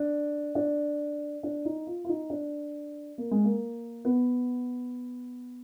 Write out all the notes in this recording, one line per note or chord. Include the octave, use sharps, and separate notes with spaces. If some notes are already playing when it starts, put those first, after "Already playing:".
Already playing: D4
D4
D4
D#4
F4
F4
D#4
D4
A#3
G#3
A#3
B3